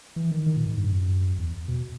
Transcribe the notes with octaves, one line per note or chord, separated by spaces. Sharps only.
E3
D#3
D#3
A#2
G#2
G2
F#2
E2
B2